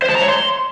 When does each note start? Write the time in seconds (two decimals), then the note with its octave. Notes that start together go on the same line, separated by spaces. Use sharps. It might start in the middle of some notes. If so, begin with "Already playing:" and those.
0.02 C5
0.09 A5
0.15 A#5
0.22 C#5
0.28 C6